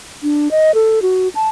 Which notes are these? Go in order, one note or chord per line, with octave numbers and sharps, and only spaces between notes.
D4
D#5
A4
F#4
A5